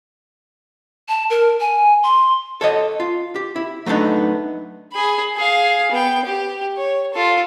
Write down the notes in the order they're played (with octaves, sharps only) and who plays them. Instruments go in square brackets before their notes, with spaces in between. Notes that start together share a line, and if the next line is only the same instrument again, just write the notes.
[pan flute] A5
A#4
G#5
C6
[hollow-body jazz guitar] A4 C#5 D#5
F4
G4
E4
F#3 A3 B3 D4 D#4
[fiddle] G#4 B5
G#4 F5
B3 G5
G4
C#5
F4 A4